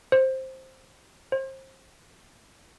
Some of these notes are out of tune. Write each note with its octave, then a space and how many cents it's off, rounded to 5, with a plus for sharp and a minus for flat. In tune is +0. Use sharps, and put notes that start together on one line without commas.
C5 +10
C5 +30